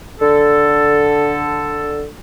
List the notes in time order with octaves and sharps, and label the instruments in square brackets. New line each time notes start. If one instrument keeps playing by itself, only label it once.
[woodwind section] D3 A4